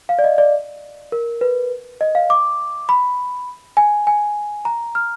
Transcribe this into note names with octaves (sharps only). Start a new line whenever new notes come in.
F5
D5
D#5
D5
A#4
B4
D#5
F5
D6
B5
G#5
G#5
A#5
F6